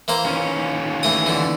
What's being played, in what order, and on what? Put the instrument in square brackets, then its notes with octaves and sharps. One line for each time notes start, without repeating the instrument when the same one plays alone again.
[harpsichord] E3 A#3 C5
[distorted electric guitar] D#2 C#4
[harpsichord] E3 A3 D#6
D3 E3